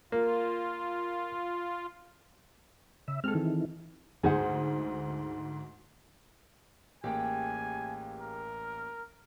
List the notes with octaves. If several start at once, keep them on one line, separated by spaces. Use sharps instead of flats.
A#3 F4
C#3 E5
G#3 C4 G#4 A4 F6
D#3 E3
D2 G#2 G#4 C5 F#5
A1 A#3 G4 G#4 G5 G#5
A#4